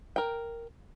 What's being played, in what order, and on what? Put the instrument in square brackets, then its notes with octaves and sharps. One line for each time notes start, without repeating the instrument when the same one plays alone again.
[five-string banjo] A#4 G5